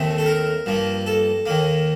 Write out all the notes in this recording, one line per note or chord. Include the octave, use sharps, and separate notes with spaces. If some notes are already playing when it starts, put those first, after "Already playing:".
Already playing: D#2 D#3 A3 C4
A4
A#4
G2 F3 A#3
A4
D#2 D#3 A#3